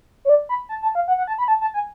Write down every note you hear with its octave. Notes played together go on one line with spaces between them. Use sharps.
C#5
D5
B5
A5
A5
F5
F#5
F#5
A5
B5
A5
A5
G#5